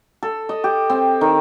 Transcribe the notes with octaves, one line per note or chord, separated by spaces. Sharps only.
A4
D#5
G4
C4
D#3